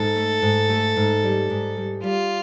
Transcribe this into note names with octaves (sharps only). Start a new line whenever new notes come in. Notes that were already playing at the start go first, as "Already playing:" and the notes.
Already playing: G#2 A4
A3
G#2
A3
G#2
G3
G#2
G3
G3 F4